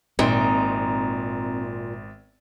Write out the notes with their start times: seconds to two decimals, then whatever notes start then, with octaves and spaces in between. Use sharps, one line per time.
0.19 G#1 A#2 C4 D#4 E5 C6